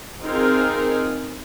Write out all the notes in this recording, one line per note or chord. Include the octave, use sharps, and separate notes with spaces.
C4 D#4 F4 G#4 A#4 C5